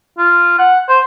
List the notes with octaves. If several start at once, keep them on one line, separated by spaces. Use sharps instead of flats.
F4
F#5
C5